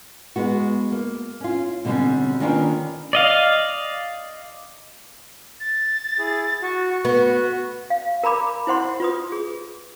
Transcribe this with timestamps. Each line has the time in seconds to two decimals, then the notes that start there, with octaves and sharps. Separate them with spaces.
0.36 G#3 B3 F#4
0.92 A#3
1.40 C#4 F4
1.85 B2 D3 G3 A#3 C4 C#4
2.40 D#3 A#3 C#4 D4 F4 B4
3.13 D5 D#5 F5
5.60 A6
6.19 E4 G#4
6.62 F#4 C#6
7.05 B3 F#4
7.90 F5
8.23 A#4 A#5 B5 D6
8.67 E4 C5 F#5 C6
9.00 F4 B4 D#6
9.32 G#4